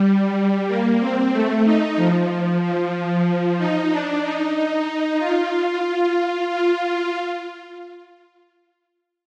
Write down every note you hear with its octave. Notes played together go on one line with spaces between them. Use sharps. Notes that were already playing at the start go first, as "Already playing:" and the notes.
Already playing: G3
A#3
C4
A3
D#4
F3
F3
D#4
D4
D#4
D#4
F4
F4